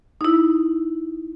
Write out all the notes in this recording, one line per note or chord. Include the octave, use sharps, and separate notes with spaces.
D#4 E4